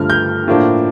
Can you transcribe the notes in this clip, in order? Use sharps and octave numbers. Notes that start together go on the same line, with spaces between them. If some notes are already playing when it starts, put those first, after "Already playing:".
Already playing: G2 D3 F3 A3 F6
G6
A2 F3 A#3 D4